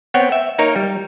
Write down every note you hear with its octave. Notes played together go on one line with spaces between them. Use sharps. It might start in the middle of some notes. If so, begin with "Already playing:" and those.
B3 C4 C#5 F#5 G5
E5
A#3 D#4 A#4 C#5
G3